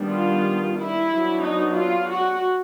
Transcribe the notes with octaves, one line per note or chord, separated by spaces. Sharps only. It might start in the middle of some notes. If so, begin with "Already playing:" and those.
Already playing: D#3 G3 B3 D4
F4
E4
F#3 B3 D4
D#4
F4
F#4